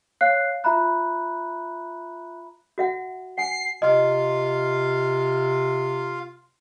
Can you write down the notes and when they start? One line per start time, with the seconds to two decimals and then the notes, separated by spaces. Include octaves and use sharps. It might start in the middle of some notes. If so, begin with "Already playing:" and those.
0.21 C#5 F5 F#6 C7
0.64 F4 E5 A#5 B5 F#6
2.78 F#4 E5 F#5
3.38 F#5 G#5 C7
3.82 C3 F4 D#5 F5